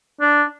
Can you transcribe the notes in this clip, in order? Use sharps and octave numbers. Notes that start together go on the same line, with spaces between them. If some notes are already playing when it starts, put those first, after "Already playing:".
D4